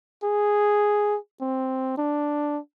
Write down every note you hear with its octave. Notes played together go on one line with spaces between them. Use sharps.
G#4
C4
D4